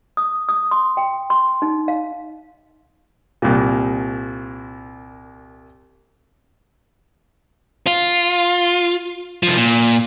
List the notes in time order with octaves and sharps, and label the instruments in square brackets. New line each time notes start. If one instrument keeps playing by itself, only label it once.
[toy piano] D#6
D#6
C6
G5
C6
D#4
F5
[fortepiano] C2 A#2
[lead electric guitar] F4
C2 F3
A#2